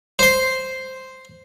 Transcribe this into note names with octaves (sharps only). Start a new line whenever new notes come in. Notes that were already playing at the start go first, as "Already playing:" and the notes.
C5 C6